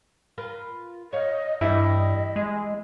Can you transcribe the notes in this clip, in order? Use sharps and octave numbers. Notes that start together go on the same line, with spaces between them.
F4 A#4 B4
C#5 D#5 F5
G2 E3 G3 E4 D#5
G#3